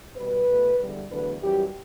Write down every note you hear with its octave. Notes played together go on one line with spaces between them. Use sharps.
B2 G3 B4
B2 A3
E2 D3 G3
E2 D3 F#3 A3 B4
F#2 E3 G3 G4